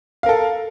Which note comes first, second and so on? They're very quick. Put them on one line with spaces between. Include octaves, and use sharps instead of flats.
F5 A#4 A4